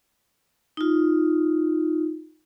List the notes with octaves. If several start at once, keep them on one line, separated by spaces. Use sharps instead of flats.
D#4 F4